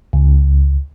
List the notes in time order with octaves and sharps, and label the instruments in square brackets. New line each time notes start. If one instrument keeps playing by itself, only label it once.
[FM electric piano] C#2